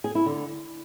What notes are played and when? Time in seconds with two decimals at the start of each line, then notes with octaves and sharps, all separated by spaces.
0.04 G#4
0.15 E4
0.26 D3